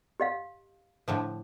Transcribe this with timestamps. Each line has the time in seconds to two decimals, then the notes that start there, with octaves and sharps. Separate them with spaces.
0.20 G4 D#5 F5
1.08 A2 D3 F3